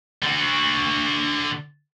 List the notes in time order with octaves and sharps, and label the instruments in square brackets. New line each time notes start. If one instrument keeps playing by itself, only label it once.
[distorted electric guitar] D3 F#4